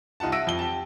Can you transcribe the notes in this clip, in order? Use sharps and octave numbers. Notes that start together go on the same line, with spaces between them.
C2 D#4 F4 F#5 A5
E5 F#5 E6 A#6 D7 D#7
F2 G7
G4 A5